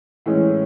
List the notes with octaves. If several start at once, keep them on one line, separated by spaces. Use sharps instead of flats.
A2 E3 G#3 C#4